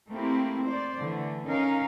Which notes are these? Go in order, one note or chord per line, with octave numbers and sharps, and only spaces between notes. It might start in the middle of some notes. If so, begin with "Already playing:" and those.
A3 A#3 C4 E4 G4
C5 D5
D3 E3 A3
C#4 D#4 A#4 F5